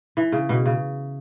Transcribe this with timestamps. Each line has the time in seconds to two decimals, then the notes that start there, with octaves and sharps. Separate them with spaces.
0.17 E3
0.32 C#3
0.49 B2
0.66 C#3